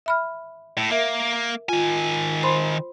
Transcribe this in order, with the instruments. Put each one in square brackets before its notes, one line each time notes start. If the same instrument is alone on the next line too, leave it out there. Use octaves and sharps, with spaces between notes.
[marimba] E5 B5 F6
[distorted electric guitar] A2
[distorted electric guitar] A#3 [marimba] A#4 E5
[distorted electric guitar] D#3 G#5 [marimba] F4
[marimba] C5 B5 C6